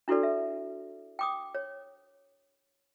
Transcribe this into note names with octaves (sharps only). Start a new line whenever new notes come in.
D4 E4 F#4 A4 B4 D5
E5
G5 D6 D#6
C#5